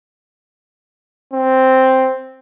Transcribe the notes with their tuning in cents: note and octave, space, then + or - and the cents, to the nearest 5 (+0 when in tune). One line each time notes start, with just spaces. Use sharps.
C4 +0